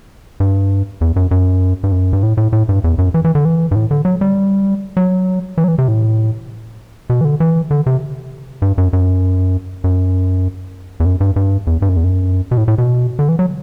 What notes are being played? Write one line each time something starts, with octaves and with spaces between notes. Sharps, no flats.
G2
E2
F#2
F#2
G2
F#2
G2
A2
A2
A2
G2
E2
F#2
E3
E3
D3
E3
G2
A2
D3
F#3
G3
F#3
E3
F#3
E3
C3
A2
B2
E3
D3
E3
D3
C3
G2
F#2
F#2
F#2
E2
F#2
G2
G2
E2
G2
F#2
E2
F#2
B2
A2
A2
B2
D3
E3
F#3